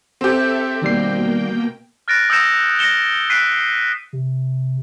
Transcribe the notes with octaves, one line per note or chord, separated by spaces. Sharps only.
C4 G4 A4 E5
B2 D#3 G3 A#3 G5 C7
F6 F#6 A6 A#6 D7
D#6 E6 G6 A#6 C#7 E7
A#6 C#7 E7 G7
F#6 B6 C7 D7 D#7
C3